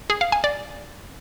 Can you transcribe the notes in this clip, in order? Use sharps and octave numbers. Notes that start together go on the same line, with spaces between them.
G#4
F5
G#5
D5